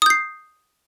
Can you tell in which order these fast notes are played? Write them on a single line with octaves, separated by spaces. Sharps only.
D#6 G6 C7